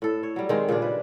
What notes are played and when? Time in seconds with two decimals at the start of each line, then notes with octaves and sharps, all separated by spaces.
0.02 A2 A4
0.23 C#5
0.36 F#3 G3
0.49 D#3 G#3 C4
0.69 A#2 C#3 G3 D4
0.82 B4